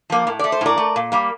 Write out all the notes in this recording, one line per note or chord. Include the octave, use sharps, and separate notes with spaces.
F3 A#3
A2
A3 D5
C5
A2 A#4 D5
A3
A#2
G3 A#3